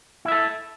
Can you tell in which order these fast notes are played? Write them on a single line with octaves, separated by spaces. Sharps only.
E4 E5 A4